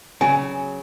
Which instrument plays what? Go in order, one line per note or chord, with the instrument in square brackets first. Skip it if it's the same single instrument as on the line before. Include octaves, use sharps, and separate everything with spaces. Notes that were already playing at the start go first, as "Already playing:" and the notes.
[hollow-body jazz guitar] C#3 F#3 [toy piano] G#5